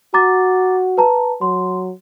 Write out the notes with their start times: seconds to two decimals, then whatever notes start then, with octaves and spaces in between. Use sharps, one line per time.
0.14 F#4 A#5 D6 A6
0.98 B4 A5 A#5
1.41 F#3 C6